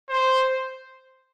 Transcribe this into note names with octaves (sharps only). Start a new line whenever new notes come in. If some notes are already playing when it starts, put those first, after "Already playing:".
C5